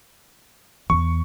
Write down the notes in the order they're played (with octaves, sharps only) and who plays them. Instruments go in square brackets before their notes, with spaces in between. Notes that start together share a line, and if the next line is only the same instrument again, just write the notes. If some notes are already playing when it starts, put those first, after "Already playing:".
[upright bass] E2 [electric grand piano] C#6